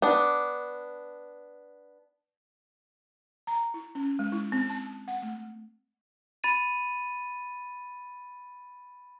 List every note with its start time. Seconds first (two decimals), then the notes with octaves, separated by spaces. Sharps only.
0.02 B3 D4
3.47 A#5
3.74 E4
3.95 C#4
4.19 G#3
4.32 E4
4.52 C4
4.70 A5
5.08 F#5
5.22 A3
6.44 B5 A6 D#7